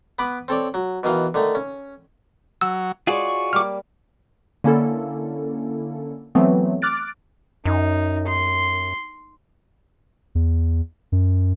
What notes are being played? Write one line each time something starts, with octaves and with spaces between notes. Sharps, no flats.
B3 B4 B5 D6
C4 A4 C#5 D5
F#3
B2 D#3 E3 F5
D3 D#3 A3
C#4
F#3 E6
G#3 F4 F#4 G#4 C#5 D5 C#6
G3 A#3 D6 F6
D3 A#3 C#4 E4 A4
E3 F#3 A3 B3 C4
D6 F6 F#6 A6 D7
F#2 D#4
C6
E2
F#2